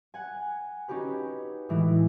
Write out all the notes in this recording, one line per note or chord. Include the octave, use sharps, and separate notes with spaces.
F#5 G#5
C#4 D#4 F#4 G4 B4
A2 E3 G#3